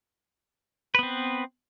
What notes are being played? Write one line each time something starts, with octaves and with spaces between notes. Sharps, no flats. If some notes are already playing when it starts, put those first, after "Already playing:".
B3 C4 B4